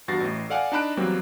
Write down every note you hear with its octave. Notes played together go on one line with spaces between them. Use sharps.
E2 G2 F#4 A6 A#6 C7
A1 A2
A4 D5 F5 F#5 G#5
D4 D#4 A5 B5 F#6 D7
E2 F#3 G3 A#3 C4